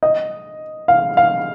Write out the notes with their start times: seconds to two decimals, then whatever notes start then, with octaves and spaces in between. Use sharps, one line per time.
0.03 D#5
0.88 F5
1.17 F5